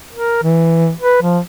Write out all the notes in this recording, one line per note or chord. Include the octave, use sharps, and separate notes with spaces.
A#4
E3
B4
F3